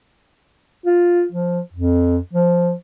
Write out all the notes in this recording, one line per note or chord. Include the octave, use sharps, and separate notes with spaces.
F4
F3
F2
F3